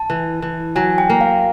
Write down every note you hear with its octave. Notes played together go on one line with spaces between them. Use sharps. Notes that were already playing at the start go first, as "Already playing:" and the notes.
Already playing: A5
E3
E3
F#3 G#5
G5
A#3
F5